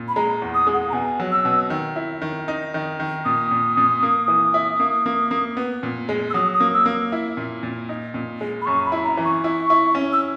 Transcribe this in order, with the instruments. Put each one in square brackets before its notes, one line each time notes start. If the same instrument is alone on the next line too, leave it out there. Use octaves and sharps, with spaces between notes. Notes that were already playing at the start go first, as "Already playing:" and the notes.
Already playing: [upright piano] A#2
[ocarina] B5
[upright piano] G#3 [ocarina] A#5
[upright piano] E2
[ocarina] D#6
[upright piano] G#3
[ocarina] F#5
A#5
[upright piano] B2 [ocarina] G#5
[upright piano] F#3
[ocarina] E6
[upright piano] B2
D#3
E4
D#3
D#4
D#3
D#3
[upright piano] A#2 [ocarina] D#6
[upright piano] A#2
A#2
A#3
E3
E4
A#3
A#3
A#3
B3
A#2
G#3
[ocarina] E6
[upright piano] F#3 [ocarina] D#6
[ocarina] D#6
[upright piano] A#3
[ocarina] E6
[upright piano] A#3
E4
A#2
A#2
D#4
A#2
G#3
[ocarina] B5
[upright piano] F#2 [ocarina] C#6
[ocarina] B5
[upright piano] E4
[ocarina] A#5
[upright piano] E3
[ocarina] C#6
[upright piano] E4
E4
C#4
[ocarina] E6